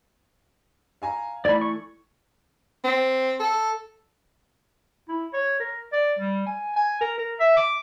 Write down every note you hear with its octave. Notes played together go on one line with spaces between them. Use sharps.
F5 G#5 A#5
E3 A3 D5 B5 G#6
C#6
C4
A4
E4
C#5
A#4
D5
G3
G#5
G#5
A#4
A#4
E5
D6